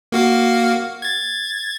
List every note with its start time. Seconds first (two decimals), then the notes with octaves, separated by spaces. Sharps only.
0.12 A#3 F#4 F5
1.02 G#6 A6